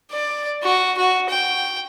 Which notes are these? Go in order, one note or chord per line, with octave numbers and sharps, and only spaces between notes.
D5
F#4
F#4
G5